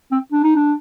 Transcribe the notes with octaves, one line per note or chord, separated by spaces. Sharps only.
C4
D4
D#4
D4